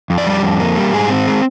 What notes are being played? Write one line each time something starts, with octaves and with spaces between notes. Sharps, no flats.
F2
D5
G3
F2
A#3
G3
G#2 G#4
C4
G#3